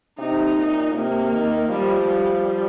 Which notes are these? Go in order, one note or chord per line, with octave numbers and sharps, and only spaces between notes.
C3 D#4
A#2
C3 A#3
D#3
F3 G3
G3